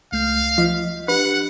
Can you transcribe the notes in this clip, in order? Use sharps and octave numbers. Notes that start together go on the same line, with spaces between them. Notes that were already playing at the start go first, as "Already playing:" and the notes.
C#2 A3 F5 G6
F3 D#5 B6
D4 G4 B4 F#5